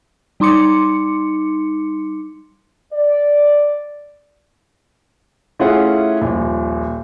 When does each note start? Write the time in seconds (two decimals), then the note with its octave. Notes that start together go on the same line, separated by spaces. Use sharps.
0.40 G3 D#4 C6 D6 C#7
2.92 D5
5.59 A3 C#4 E4 F4 G#4 F#5
6.21 D#1 A#1